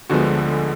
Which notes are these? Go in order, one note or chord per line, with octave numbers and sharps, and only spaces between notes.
D2 D3 F3 G#3 B3 F#4